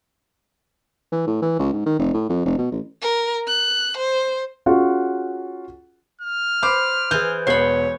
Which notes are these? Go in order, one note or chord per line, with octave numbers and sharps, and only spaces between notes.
E3
A2
E3
C#2
G#2
D#3
F1
A2
F2
F1
B2
A1
A#4
F#6
C5
C#4 F4 F#4 G#4 F#5
F6
C5 B5 D6
E3 G#4 G6
E1 B3 C#5 B5 C6